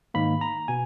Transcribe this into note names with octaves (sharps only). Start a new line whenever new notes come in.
G#2 D#3 A#3 B5
A#5
B2 G#5